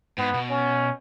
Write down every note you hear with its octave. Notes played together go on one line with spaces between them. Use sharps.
G#2 B3
B2
C#4